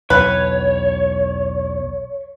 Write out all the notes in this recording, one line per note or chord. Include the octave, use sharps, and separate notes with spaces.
B1 E2 B4 C#5